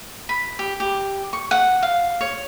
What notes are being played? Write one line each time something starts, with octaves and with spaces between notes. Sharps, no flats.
B5
G4
G4
C#6
F#5
F5
C#5